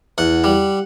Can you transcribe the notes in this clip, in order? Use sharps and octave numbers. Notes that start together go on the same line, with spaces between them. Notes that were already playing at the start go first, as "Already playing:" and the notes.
E2 F#5
G3